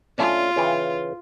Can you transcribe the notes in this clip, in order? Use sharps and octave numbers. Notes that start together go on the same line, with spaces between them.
A3 C#4 D4 F4
C#3 E3 G5